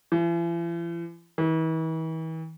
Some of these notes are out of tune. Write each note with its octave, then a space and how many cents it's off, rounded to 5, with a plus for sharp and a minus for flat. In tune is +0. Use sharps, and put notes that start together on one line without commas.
E3 +45
E3 -40